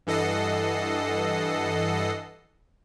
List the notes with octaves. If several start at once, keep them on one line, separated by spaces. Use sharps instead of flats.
G2 E3 A4 D#5 F#5 C7